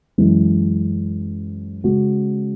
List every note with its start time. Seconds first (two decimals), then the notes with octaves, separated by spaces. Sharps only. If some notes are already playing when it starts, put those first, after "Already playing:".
0.18 F#2 E3 G#3
1.84 C#3 G#3 C#4 F#4